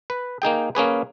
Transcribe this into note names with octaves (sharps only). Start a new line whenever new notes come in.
B4
A#3 D#4 G#4 G5
A#3 C#4 G#4 B4